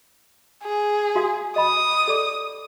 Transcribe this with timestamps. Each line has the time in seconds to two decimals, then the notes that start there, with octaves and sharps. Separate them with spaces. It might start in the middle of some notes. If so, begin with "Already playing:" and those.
0.63 G#4
1.16 F#4 F5 D#6
1.56 D#5 B5 D#6
2.08 A4 D5 D6